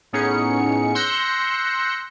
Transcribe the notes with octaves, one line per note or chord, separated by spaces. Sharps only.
A2 B3 C#4 D#4 G#4 C#7
C6 E6 F#6 G6 A#6 C#7